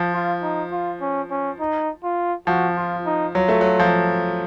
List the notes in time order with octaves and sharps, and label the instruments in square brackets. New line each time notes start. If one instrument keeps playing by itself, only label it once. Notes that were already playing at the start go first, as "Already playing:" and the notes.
Already playing: [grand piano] F3
[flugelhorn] F4
D#4
F4
C#4
C#4
D#4
F4
[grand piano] F3 [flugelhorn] F#4
[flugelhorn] F4
D#4
[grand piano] F#3 [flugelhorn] F4
[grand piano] A3
F#3
F3